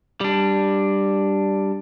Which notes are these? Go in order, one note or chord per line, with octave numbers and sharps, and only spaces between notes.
G3 D4